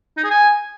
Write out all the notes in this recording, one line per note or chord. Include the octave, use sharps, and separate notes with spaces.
D#4
G#4
G#5